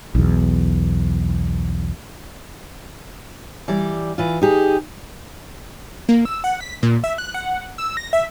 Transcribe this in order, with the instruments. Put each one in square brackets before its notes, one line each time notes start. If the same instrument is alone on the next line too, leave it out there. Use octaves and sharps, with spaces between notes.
[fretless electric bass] B1 E2
[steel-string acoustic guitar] E3 G3 D5
E3 F4
D#4 G4 G#4
[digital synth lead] A#3
E6
F#5
B6
A#2
E5
F#6
F#5
E6
A#6
E5